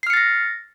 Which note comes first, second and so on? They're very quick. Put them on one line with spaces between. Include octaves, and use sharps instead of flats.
C7 F6 C#7 A6 A#6